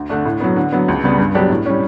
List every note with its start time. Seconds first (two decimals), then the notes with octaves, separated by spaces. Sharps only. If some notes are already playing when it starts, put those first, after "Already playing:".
Already playing: D2
0.10 D3 A3 D4
0.25 A2
0.40 F#3 B3
0.56 D3
0.72 F#3 B3
0.88 C#2
1.03 C#3 G3 B3
1.18 G2
1.35 F#3 B3 D4 G4
1.50 A2
1.66 G3 C#4